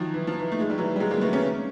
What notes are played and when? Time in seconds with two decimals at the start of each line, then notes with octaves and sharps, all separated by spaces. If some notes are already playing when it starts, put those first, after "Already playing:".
Already playing: D#3 F3 F#3
0.14 E3
0.27 F3
0.40 E3
0.52 A3
0.60 G#3
0.70 G3
0.78 E3 F#3
0.96 G3
1.00 F#3 G#3
1.11 G#3 A#3
1.21 A3 B3
1.33 B3 C#4